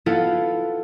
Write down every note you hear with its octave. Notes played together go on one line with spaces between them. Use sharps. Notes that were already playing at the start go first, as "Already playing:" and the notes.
B3 E4 F4 A4 F5 F#5